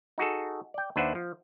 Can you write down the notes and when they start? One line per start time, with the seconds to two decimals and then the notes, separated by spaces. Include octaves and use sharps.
0.18 D#4 F#4 G#4 A4
0.74 D5 G5
0.96 D#2 D4 B4 C5 E5 F#5
1.15 F3